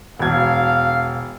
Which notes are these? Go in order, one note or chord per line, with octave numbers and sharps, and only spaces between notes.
E1 F5 G#6